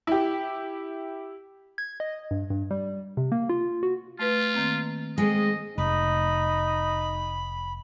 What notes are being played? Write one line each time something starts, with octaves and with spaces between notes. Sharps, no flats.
E4 G4
G#6
D#5
G2
G2
G3
C3
A#3
F4
F#4
A3 F4 B4
D#3 A#3 C4
G#3 C4 D#5 G#5
F1 D#4 B5